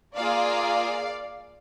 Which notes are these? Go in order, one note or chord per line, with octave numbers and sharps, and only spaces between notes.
A#3 F4 G#4 D5 F5